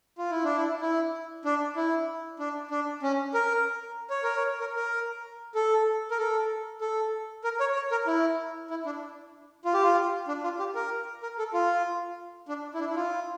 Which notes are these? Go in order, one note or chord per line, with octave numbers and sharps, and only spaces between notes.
F4
E4
D4
E4
E4
D4
E4
D4
D4
C#4
A#4
C#5
A#4
C#5
A#4
A#4
A4
A#4
A4
A4
A#4
C#5
C#5
A#4
E4
E4
D4
F4
G4
F4
D4
F4
G4
A#4
A#4
A4
F4
D4
E4
D4
E4
F4